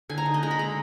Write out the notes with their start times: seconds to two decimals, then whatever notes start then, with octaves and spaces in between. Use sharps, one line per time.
0.09 D3 G#5
0.18 A#5
0.26 D#4
0.34 D#5
0.43 G#3 A#5
0.51 B5
0.59 D3 A#5